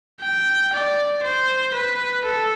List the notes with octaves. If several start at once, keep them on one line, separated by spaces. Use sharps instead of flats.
G5
D5
C5
B4
A4